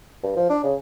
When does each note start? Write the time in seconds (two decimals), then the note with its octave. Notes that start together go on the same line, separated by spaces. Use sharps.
0.23 G2
0.36 F3
0.50 D4
0.64 C#3